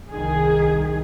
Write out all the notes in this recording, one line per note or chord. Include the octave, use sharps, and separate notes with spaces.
C2 D#3 G#4